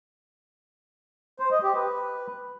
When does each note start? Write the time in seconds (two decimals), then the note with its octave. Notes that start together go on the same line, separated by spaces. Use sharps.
1.40 C5
1.51 D#5
1.63 G4
1.75 B4